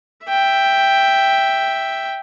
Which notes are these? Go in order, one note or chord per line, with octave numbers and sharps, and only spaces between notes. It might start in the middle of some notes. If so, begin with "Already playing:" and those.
E5 G5